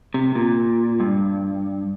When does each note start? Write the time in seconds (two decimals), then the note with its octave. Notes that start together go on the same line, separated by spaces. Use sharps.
0.14 C3
0.35 A#2
1.00 G2